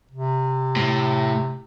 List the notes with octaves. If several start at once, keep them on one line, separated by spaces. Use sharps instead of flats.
C3
A2